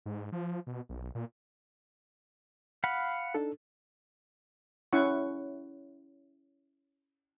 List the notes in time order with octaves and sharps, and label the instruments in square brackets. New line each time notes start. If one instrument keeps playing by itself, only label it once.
[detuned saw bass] G#2
F3
B2
B1
A#2
[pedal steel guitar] F5 F#5 B5
[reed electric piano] D4 D#4 A4
[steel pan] C#4 E4 F#5 C#6